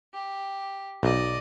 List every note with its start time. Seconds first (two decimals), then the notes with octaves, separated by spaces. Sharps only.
0.14 G4
1.03 B1 D5 D#5